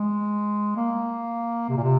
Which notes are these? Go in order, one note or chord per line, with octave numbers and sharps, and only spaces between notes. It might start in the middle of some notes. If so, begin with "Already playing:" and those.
Already playing: G#3
A#3
C3
A#2
C3